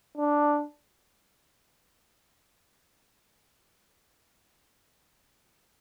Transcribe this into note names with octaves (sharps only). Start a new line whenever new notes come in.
D4